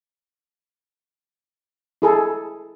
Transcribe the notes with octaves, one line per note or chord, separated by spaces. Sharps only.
E4 G#4 A4